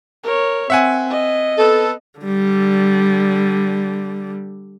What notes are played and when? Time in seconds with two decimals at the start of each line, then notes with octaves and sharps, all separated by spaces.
0.24 A#4 C#5
0.70 C4 E5 F#5 G#5
1.10 D#5
1.58 B3 A4
2.20 D3 G3